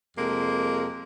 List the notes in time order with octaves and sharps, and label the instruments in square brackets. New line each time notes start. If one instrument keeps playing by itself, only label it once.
[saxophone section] F2 C3 G#3 A#3